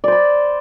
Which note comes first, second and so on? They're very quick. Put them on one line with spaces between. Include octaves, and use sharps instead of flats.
D5 C5 B5